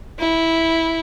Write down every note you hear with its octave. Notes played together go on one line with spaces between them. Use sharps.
E4